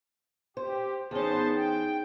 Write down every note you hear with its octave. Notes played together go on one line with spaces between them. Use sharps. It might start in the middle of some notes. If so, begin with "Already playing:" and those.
G4 C5
E2 B3 C#4 D#4 G#4 C5 A5
G5